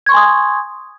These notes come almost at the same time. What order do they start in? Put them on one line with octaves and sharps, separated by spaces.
G#6 C#6 C6 G#5 D#6